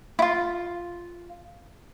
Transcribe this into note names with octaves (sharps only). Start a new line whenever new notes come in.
E4 F4